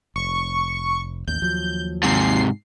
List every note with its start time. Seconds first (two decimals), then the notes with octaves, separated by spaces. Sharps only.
0.16 F1 C#6
1.27 A1 D#2 G6
1.42 D#2 F3 F#3
2.03 G#2 C3 C7